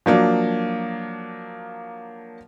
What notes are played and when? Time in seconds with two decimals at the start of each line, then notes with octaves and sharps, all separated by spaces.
0.06 F3 F#3 A#3 D4